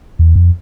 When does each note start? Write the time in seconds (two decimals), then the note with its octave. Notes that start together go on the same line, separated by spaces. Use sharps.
0.19 E2
0.36 F2